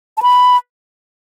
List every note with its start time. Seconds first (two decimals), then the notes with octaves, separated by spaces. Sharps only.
0.17 A5
0.23 B5